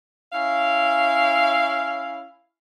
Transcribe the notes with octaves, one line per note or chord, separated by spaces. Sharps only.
C#4 E4 F5